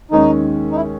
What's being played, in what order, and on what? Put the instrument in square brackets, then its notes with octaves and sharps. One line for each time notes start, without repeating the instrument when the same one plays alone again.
[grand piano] D#2 D#3 G#3 C#4 [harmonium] D#4
[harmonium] D#4
E4